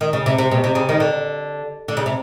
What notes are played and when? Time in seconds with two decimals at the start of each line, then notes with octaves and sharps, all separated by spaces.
0.01 D#3
0.13 C#3
0.26 C3
0.38 C3
0.51 B2
0.64 C3
0.75 C#3
0.89 D#3
1.00 D3
1.88 D3
1.97 C#3
2.06 C3